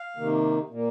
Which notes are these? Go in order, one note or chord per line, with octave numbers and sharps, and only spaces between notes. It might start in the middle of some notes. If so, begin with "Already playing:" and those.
Already playing: F5
C3 D#3 A#3
A#2 A#3